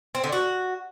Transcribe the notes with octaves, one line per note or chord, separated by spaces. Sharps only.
C4
D3
F#4